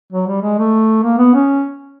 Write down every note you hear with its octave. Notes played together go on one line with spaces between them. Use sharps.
F#3
G3
G#3
A3
A#3
B3
C#4